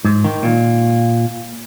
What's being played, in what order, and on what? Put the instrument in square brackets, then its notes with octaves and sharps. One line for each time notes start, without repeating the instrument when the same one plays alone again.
[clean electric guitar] G#2
D#3
A#2